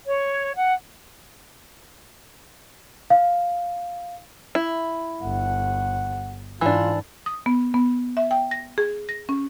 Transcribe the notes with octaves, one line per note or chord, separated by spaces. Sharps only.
C#5
F#5
F5
E4
G1 F#5
G#2 E3 D4 F4
D#6
B3
B3
E5
G5
A#6
G#4
A#6
C#4